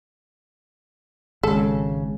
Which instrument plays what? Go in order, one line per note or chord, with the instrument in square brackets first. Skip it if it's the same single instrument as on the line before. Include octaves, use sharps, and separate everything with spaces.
[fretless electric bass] G#1 C#3 [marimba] G#3 [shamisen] A4